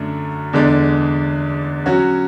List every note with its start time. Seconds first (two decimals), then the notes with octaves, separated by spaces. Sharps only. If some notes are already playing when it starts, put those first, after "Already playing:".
Already playing: F#2 D3 A3 D4
0.53 E2 D3 G#3 D4
1.86 F#3 C#4 F#4